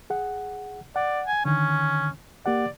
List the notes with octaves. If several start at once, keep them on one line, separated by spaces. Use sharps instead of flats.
G#4 F#5
D5 F#5
G#5
D3 D#3 C#4
A#3 G4 D5 F#5